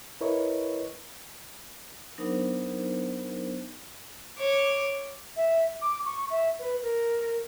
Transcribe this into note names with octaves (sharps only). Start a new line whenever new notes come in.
E4 A#4 B4 C#5 D#5 C#6
F#3 B3 D4 D#4 A#4 C5
C#5 D6
E5
D6
C#6
E5
B4
A#4